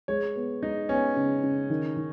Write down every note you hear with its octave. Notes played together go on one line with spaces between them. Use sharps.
G#3 C#5
B3
G#3 D#4
B3 C#4
C#3
C#3
D#3
D#3